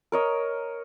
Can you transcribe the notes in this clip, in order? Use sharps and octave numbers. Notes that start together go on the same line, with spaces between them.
A#4 C#5 D#5